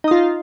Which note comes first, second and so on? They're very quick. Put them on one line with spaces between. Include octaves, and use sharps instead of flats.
D#4 D#5 F4